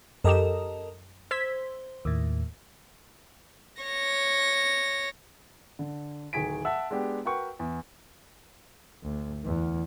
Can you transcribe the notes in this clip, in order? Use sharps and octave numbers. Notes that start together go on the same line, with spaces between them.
F#2 G4 A4 A#4 D#5 E7
C5 E6 G#6 B6
D#2 A2
C#5 A#6
D3
D1 D#3 G#4 G#5 B6 D7
E5 F#5 A5 E6
G#3 B3 D4 G4
F#4 A#4 B4 F#5 G5 C#6
E2
D2
E2